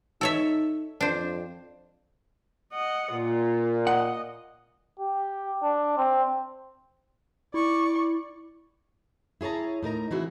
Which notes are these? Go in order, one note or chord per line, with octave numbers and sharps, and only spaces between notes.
D#4 A4 C#5 E5
F2 D4 C5
D#5 F#5
A#2 F4
D#5 F#5
G4
D4
C4
E4 D5 C#6
E4 G#4 C#5 A5 A#5
A2 D#4 A#4 A#5
E3 C4 E4 F#4 G#4